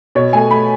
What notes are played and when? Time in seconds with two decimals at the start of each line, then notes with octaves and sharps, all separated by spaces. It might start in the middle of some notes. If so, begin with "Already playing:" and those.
0.15 B2 C#5
0.33 A3 G#5
0.50 A3 B5